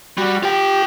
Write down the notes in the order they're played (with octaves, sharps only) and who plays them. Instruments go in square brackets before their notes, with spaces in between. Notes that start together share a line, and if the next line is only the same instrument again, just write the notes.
[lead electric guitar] G3 [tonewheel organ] F#4
[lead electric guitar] F4 G5 [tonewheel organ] G4